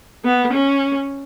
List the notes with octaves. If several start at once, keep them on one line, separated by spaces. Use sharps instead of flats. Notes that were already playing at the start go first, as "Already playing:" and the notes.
B3
C#4